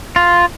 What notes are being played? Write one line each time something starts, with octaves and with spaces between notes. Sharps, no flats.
F4